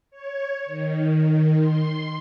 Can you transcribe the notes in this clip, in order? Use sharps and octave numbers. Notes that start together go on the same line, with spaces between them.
C#5
D#3
C6